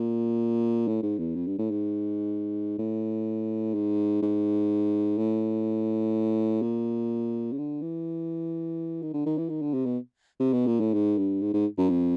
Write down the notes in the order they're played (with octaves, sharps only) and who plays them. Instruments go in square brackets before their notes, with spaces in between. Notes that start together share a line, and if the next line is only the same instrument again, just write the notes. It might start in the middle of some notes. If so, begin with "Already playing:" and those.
Already playing: [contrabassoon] A#2
A2
G#2
E2
F2
G2
A2
G#2
A2
G#2
G#2
A2
A#2
C#3
D3
E3
D#3
D3
D#3
E3
D#3
D3
C3
B2
C3
B2
A#2
A2
G#2
G2
G#2
G#2
F#2
F2